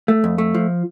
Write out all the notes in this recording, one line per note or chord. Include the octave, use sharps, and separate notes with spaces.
A3
F2
A3
F3